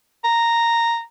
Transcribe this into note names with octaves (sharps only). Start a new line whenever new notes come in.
A#5